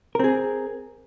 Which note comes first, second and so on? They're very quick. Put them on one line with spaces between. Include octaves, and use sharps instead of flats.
A#4 C4 G#4